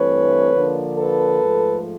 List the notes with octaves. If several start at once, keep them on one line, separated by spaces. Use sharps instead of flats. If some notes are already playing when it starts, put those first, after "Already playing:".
Already playing: G2 E3 A3 C4 B4 C#5
D3 F3 A#3 D4
A4 B4
G#2 F3 A3